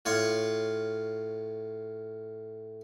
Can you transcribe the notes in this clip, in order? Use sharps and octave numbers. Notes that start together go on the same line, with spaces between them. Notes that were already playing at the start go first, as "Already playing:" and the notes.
A2 F4 C#5 F5 F#5